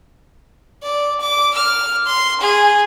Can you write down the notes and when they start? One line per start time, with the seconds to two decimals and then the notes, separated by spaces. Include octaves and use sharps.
0.83 D5
1.21 D6
1.55 F6
2.06 C6
2.41 G#4